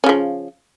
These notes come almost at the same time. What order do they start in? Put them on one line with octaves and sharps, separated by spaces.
C#4 C#3 F3